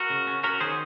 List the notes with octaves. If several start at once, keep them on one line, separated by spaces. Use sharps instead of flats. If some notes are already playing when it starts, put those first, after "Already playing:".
Already playing: F#4 A#4
C#3
C#4
C#4 F#4 A#4
D#3 G#4 C5